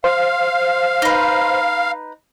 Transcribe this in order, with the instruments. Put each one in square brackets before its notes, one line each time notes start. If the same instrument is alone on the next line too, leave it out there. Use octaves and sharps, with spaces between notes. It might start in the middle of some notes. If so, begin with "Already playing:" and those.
[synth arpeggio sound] C5 [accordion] F5
[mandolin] D#4 B4